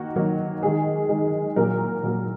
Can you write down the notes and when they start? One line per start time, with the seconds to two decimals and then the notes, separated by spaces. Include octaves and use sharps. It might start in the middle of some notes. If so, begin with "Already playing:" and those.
Already playing: D#3 A#3 F#4
0.16 D#3 F#3 A#3
0.63 D#3 G#3 G#4
1.09 D#3 G#3
1.56 A#2 F#3 A#3 A#4
2.03 A#2 F#3 A#3